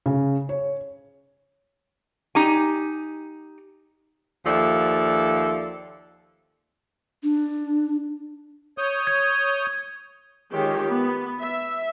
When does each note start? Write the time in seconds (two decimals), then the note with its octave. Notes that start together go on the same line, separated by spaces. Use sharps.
0.06 C#3
0.49 C#5
2.35 D#4 G4 G#5
4.46 D#2 F3 A4 D5 E5
7.23 D4
8.78 C#5 D#6 G6
9.07 G#6
10.51 D#3 G#3 F4 G4 C#5
10.89 B3
11.39 E5